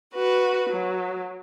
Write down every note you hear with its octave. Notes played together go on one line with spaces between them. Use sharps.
F#4 B4
F#3